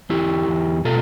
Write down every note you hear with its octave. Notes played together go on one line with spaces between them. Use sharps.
E2 E4 G4
E2
B2 F4 A4